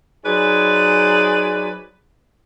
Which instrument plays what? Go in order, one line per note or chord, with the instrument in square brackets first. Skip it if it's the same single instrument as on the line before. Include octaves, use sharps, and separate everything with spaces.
[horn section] F#3 D#4 G#4 B4 C5 D5